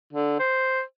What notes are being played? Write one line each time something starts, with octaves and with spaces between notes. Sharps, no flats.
D3
C5